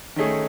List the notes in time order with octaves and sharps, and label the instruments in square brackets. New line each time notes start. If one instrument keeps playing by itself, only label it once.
[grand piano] D#3 A3 C#4 G#4